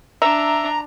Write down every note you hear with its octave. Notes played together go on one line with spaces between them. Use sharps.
D4 E5 A#5